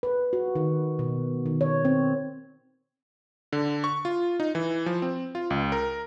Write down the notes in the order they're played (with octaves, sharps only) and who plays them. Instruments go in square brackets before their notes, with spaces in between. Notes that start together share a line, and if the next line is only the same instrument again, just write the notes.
[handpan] B4
F#4
D#3
B2
D#3
C#5
C4
[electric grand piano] D3
C#6
F4
D#4
E3
F3
C4
F4
C#2
A#4